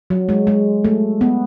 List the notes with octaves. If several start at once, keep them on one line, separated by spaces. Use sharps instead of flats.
F#3
G#3
G#3
A3
B3